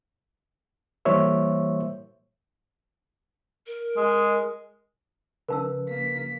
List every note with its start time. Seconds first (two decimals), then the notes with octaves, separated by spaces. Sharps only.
1.05 E3 G3 A#3 C5 C#5 E5
3.67 A#4
3.97 G#3
5.48 C#3 F3 A#4 B4 A5 E6
5.88 A#3 B6